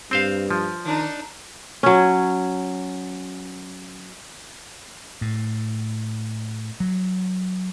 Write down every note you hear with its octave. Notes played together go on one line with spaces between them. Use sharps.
G2 C4 C5 F5
F3
D#3 D4 D#4
F#3 C#4
A2
F#3